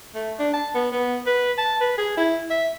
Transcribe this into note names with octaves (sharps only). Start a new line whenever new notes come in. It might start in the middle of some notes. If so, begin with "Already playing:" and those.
A3
D4
A5
B3
B3
B4
A5
B4
G#4
E4
E5